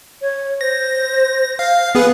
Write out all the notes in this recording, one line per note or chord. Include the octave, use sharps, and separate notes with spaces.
C#5
C5 A#6
F5
B3 G#4 B4